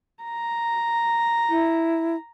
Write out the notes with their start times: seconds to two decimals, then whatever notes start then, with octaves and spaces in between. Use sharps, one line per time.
0.23 A#5
1.50 E4